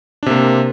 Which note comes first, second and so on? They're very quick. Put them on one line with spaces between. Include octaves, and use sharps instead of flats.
D4 C3 A#3